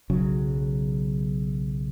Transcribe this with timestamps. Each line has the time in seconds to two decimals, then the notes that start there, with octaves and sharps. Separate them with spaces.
0.10 B1 C#3 F#3